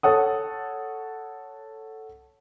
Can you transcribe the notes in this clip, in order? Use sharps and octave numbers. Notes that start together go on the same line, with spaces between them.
A4 C#5 F#5 D#6